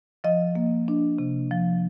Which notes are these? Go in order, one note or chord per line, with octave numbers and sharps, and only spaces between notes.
F3 D#5
A#3
D4
C3
F3